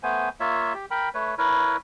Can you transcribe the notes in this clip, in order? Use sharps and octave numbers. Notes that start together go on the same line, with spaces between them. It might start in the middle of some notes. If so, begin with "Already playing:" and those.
A3 B3 C5 G#5
A#3 F4 C#5 E5
G4
A#4 G5 B5
A3 B4 C#5
E4 A#4 B4 C#5